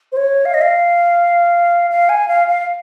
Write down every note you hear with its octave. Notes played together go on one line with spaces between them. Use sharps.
C5
C#5
F5
D#5
F5
F5
G#5
F5
F5